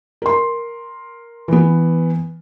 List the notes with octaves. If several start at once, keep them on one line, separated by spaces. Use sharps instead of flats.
A#4 C6
E3 B3